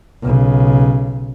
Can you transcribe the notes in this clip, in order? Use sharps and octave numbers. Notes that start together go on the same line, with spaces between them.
B1 C#3